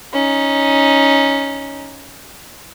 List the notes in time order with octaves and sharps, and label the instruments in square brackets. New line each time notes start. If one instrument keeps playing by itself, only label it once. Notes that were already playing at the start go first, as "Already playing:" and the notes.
[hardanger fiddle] C#4 D#4